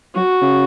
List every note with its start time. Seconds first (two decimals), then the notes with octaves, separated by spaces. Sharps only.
0.15 F#3 F#4
0.42 C#3